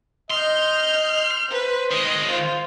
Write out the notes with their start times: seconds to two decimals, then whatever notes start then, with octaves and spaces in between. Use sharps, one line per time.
0.31 D#5 C6 F6 G6
1.51 B4 C5
1.91 D#3 G#3 D#5
2.29 F4 C5